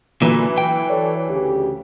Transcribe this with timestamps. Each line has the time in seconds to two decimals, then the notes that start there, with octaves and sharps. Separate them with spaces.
0.22 A#2 D3 E3 F#3 E4
0.58 G5
0.89 A4 C#5 D5
1.28 D2 C#3 G4